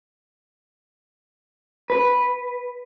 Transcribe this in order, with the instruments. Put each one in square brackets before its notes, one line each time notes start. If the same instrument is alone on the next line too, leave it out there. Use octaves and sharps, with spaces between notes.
[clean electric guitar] B4